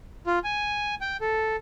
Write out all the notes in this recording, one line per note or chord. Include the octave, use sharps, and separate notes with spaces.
F4
G#5
G5
A4